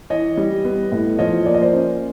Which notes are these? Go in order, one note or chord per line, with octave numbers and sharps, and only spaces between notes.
E3 C#5 D#5
G3
B3
A2
F3 C#5 D#5
A#3 D5
D#5
C5 D5
C#4